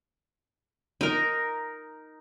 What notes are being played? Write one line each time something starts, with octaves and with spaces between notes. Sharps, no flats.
D#4 A#4